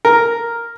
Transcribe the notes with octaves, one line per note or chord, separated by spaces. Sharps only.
A#4